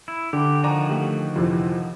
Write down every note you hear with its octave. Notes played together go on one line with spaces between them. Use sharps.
E4
D3 G4
D#3 F3 F#4 D5 G#5 A#5
A3 G4
F2 C3 E3